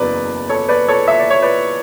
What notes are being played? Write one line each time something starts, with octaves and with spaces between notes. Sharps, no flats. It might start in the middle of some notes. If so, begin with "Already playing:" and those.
Already playing: F#1 E2 C#3 F#3 B4 D5
A4 C#5
B4 D5
A4 C#5
E5
D5
C#5
B4 D5